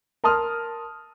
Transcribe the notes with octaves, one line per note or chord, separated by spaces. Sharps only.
A#4 A5 C6 D#6 F6